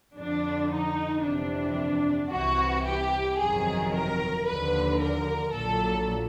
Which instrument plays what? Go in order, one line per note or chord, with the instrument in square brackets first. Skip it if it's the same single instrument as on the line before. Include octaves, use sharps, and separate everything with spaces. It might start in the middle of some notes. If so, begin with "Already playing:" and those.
[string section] F2 D3 F3 D4
D#4
G1 F2 C3 E3 D4
C2 C3 E3 F#4
G4
G1 F2 C3 D#3 F#3 G#4
A#4
D#2 D3 F3 B4
A#4
A#1 A#2 F#3 A4